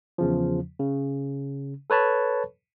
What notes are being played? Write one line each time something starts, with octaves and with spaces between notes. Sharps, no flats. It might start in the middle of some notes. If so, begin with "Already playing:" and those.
E2 C#3 F3
C#3
A4 B4 C#5 A5 B5